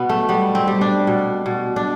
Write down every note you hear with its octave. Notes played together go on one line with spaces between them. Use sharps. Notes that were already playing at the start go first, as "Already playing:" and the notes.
Already playing: B2 B3
A3
G3 B3
C4
G3
D4
B2
B2
D4